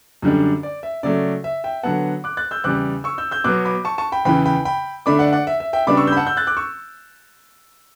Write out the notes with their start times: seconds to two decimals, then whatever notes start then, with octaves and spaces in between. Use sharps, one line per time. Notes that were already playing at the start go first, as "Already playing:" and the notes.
0.22 F#2 D3 G3 D4
0.63 D5
0.83 E5
1.03 C#3 F#3 A3 D5
1.44 E5
1.64 E5 G5
1.83 D3 F#3 B3 F#5 A5
2.24 D6 F#6
2.37 F#6 A6
2.51 E6 G6
2.64 E2 C#3 G3 D6 F#6
3.04 C#6 E6
3.18 E6 G6
3.31 E6 G6
3.44 B2 F#3 B3 D6 F#6
3.65 B5 D6
3.85 A5 C#6
3.98 A5 C#6
4.12 G5 B5
4.25 E2 C#3 E3 G5 B5
4.45 G5 B5
4.65 G5 B5
5.06 D3 A3 D4 B5 D6
5.19 D5 F#5
5.33 D5 F#5
5.47 E5
5.60 E5
5.73 E5 G5
5.87 C#3 G3 B3 D4 B5 D6
5.97 C#6 E6
6.07 E6 G6
6.12 B5
6.17 F#5 A5
6.27 E6 G6
6.37 F#6 A6
6.47 D6 F#6
6.57 C#6 E6